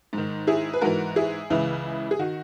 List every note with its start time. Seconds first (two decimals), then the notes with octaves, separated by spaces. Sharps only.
0.13 G#2 D#3
0.47 E4 G#4
0.73 B4
0.81 G#2 E3 F#4 A#4
1.16 E4 G#4
1.50 C#2 C#3 E3 E4
2.11 G#4
2.19 D#3 F#4